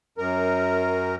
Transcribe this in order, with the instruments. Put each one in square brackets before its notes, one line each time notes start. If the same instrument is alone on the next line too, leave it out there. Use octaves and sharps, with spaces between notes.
[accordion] F#2 A#4